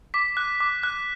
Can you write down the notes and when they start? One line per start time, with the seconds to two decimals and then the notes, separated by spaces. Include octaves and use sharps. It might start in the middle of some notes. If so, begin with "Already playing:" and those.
0.14 D6 B6
0.37 F#6
0.60 D6
0.83 F#6